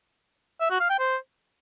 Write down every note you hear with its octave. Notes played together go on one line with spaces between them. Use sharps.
E5
F#4
F5
G5
C5